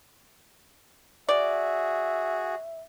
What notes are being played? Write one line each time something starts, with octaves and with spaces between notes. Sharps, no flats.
F#4 G#4 D5 E5